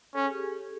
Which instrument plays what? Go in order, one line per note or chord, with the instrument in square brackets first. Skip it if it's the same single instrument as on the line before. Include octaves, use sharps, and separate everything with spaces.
[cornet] C#4 [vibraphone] A4
[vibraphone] G#4
G4
G#4